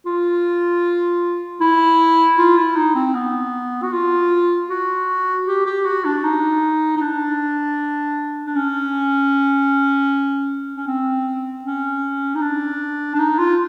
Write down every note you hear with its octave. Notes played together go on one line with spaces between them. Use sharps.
F4
E4
F4
E4
D#4
C4
B3
F#4
F4
F#4
G4
G4
F#4
D4
D#4
D#4
D4
D4
C#4
C#4
C4
C#4
D#4
D4
D4
D#4
F4